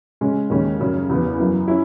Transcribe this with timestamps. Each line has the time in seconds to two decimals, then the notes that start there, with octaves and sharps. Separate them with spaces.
0.21 C#3 G#3 C#4
0.50 D#2 C#3 G#3 C#4
0.80 F#2 C#3 F#3 C#4
1.09 E2 C#3 E3 B3
1.38 F#2 E3 B3
1.68 C#4 E4